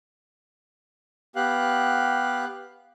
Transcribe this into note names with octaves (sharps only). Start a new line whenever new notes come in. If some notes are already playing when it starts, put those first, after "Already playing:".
B3 G4 F5 F#6